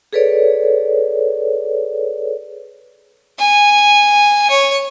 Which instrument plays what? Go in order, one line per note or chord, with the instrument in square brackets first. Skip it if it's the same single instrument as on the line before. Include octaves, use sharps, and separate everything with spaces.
[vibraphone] G#4 A4 B4 C#5 D5
[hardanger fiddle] G#5
C#5